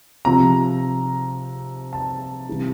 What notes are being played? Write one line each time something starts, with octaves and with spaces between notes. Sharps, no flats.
C3 F3 A#5
A5
C3 E3 G3